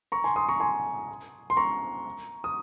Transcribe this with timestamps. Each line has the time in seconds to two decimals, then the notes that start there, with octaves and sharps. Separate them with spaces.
0.12 A#5 C#6
0.24 G#5 C6
0.36 C6 D#6
0.48 A#5 C#6
0.60 G#5 C6
1.50 C6
1.57 A#5 C#6
2.44 D#6